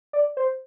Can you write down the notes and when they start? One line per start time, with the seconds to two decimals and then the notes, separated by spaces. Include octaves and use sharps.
0.13 D5
0.37 C5